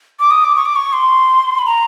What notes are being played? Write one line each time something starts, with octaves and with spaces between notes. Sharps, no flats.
D6
D#6
D6
C#6
D6
C#6
C6
B5
A#5